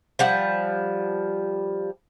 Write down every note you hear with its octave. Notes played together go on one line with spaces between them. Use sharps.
F3 G3 F#5